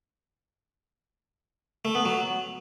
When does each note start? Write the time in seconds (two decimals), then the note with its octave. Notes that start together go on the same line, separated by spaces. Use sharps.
1.85 A3
1.95 B3
2.05 F#3